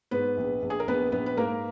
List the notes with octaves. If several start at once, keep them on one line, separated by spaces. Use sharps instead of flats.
G#2 B3 B4
A#1
A#1
G#4
A#4
A#1 B3 B4
A#1 B3 B4
B4
G#2 A#3 A#4